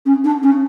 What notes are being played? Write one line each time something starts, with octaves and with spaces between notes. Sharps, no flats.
C#4
D4
C#4